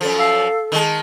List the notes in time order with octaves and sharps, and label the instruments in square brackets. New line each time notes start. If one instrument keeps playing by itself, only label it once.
[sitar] F#2 F3 [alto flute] A4
[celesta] F5 E6 C7
[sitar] D#3 G#3 [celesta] D#5 A5